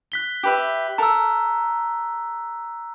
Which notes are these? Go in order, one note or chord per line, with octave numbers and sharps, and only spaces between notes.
F#6 B6 G7
G4 B4 E5
A4 A#4 A#5 E6